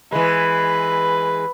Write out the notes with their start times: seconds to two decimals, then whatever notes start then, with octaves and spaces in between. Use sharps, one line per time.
0.12 E3 G#3 B4